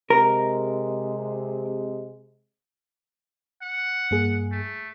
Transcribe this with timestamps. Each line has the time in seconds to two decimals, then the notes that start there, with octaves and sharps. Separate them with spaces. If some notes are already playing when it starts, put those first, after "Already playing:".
0.10 C3 G#3 A#4
3.62 F#5
4.11 G2 A#3 G#4
4.52 A3